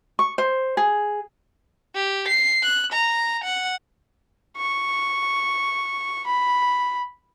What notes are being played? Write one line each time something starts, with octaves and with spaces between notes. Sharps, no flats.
C#6
C5
G#4
G4
C7
F#6
A#5
F#5
C#6
B5